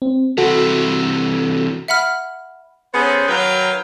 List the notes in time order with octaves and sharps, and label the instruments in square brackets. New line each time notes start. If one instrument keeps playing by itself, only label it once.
[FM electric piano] C4
[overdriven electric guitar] C3 E3 [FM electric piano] F#4 A4
[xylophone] E5 F#5 B5 F6
[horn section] B3 C#4 G#4 A4 C5
D#3 F#3 B4 F5 G5 A#5